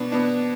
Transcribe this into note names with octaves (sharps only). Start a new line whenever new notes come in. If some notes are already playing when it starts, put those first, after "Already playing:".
Already playing: B2 B3 D4
B2 B3 D4